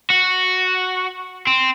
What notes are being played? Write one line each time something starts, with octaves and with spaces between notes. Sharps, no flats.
F#4
C4